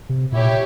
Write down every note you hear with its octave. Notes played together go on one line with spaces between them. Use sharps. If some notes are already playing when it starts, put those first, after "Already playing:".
C3
A#2 E4 G4 C#5